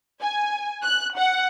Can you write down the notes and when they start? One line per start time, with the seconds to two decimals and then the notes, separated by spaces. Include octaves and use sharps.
0.21 G#5
0.83 F#6
1.17 F#5